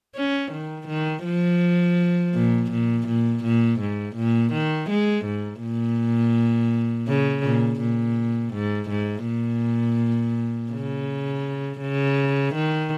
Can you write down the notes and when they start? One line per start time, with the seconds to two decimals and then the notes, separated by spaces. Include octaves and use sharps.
0.15 C#4
0.51 D#3
0.88 D#3
1.25 F3
2.34 A#2
2.71 A#2
3.07 A#2
3.43 A#2
3.80 G#2
4.16 A#2
4.53 D#3
4.90 G#3
5.25 G#2
5.62 A#2
7.08 C#3
7.44 A#2
7.80 A#2
8.54 G#2
8.89 G#2
9.27 A#2
10.72 C#3
11.81 C#3
12.55 D#3